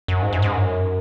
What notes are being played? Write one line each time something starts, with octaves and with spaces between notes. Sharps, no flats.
F#2
G#2
F#2
G#2
F#2